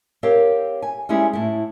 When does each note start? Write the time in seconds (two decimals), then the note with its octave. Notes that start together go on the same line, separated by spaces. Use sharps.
0.23 C4 G4 A#4 C#5 F5
0.82 G#5
1.09 G3 G#3 C#4 E4 G#4
1.33 A2 E4